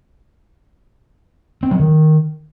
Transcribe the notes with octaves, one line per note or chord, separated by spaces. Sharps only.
C4
F#3
D#3